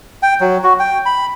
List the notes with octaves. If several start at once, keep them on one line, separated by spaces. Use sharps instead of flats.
G5
F#3
F#4
G5
B5